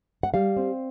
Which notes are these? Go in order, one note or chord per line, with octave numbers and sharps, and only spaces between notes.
F#5
G3 F5
C4